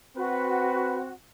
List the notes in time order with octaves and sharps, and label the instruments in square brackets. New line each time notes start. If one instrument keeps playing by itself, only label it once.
[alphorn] C4 [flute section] F#4 [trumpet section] B4